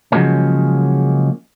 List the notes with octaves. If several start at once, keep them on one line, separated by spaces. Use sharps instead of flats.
C#3 F3 F#3 G#3 A#3 C#4